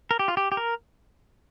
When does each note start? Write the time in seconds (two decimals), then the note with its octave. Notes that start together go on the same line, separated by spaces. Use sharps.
0.11 A#4
0.19 G4
0.28 F4
0.37 G4
0.52 G4
0.57 A#4